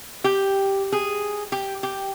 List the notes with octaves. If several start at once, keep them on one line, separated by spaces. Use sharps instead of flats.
G4
G#4
G4
G4